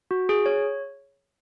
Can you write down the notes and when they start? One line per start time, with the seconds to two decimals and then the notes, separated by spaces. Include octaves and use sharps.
0.11 F#4
0.29 G#4
0.46 C#5